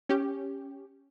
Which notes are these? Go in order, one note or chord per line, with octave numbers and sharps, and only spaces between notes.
C#4 G4